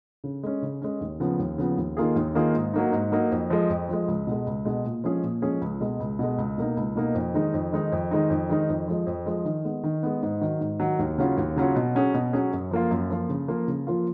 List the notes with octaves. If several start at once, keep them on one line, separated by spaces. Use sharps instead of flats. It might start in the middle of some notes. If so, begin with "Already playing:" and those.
C#3
G#3 C#4
C#3
G#3 C#4
D#2
C#3 F3 B3
D#2
C#3 F3 B3
D#2
D#3 A#3 F4 G#4
D#2
D#3 A#3 F4 G#4
G#2
F#3 A#3 D#4
G#2
F#3 A#3 D#4
F2
F3 G#3
F2
F3 G#3
C#2
B2 G#3
C#2
B2 G#3
A#2
F3 G#3 C#4 G#4
A#2
F3 G#3 C#4 G#4
C#2
B2 G#3
C#2
B2 G#3
C#2
B2 A#3 D#4
C#2
B2 A#3 D#4
F2
D#3 G#3 D#4
F2
D#3 G#3 D#4
F2
D#3 G#3 D#4
F2
D#3 G#3 D#4
F2
F3 G#3
F2
F3 G#3
D#3
G#3 B3
D#3
G#3 B3
G#2
D#3 F#3
G#2
D#3 F#3
D#2
C#3 F#3 C#4 F4
D#2
C#3 F#3 C#4 F4
B2
F#3 C#4 G#4
B2
F#3 C#4 G#4
F#2
F3 A#3 F4
F#2
F3 A#3 F4
C#3
F3 A#3 F4
C#3
F3 A#3 F4